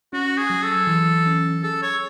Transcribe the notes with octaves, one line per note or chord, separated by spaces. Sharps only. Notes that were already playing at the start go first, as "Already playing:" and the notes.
C#4 F#4
G#4
F#3
A4
E3
C#4
G#4 A4
C#5